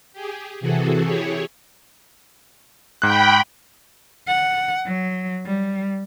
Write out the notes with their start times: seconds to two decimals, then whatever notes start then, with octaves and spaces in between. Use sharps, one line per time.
0.13 G4 G#4
0.60 C3 E3 F#4 G#4 A4
1.03 E4 G4 G#4 C#5
3.02 G#2 G5 B5 F#6
4.27 F#5
4.86 F#3
5.46 G3